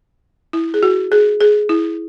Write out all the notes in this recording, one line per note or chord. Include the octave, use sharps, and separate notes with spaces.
E4
G#4
F#4
G#4
G#4
E4